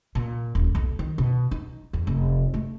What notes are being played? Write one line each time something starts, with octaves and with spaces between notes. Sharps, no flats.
A#2
D#1
B1
D#3
B2
D#4
E2
F1
A3